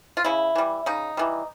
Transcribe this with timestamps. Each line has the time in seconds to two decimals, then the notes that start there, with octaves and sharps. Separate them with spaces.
0.17 F4
0.24 C#3 E4
0.55 E3 G3
0.86 C#3 D#4
1.17 E3 G3